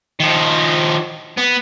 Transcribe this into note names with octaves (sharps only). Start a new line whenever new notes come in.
D#3 F3
B3